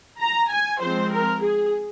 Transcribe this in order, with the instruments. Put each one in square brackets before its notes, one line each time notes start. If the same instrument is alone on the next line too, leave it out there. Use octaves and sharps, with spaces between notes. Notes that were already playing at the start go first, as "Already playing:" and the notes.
[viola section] A#5
G#5
F3 G#3 C4 C5
A#4
G#4